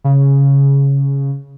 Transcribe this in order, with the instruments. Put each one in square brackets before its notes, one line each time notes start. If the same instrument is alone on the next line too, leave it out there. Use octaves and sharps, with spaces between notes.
[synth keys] C#3